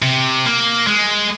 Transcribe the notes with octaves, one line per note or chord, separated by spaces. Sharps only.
C3
A#3
G#3